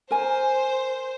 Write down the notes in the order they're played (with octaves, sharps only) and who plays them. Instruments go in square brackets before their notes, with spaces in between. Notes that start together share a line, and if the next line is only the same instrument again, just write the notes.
[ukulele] A#4 G#5 [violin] C5